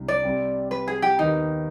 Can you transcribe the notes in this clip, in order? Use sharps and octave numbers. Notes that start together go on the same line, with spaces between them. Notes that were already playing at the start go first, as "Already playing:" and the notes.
Already playing: C2 C3 D4
D5
C3 G3 C4
B4
G#4
G4
D#2 D#3 B3 D#4